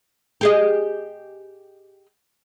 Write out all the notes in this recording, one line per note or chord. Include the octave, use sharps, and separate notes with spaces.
G4 G#4 D#5